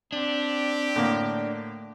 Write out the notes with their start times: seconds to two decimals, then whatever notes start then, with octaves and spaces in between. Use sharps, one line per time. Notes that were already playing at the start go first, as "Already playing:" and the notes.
0.12 C4 D4 G4
0.96 A2 D3 A#3